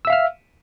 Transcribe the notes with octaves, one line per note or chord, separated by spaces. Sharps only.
E5 F5 E6 F6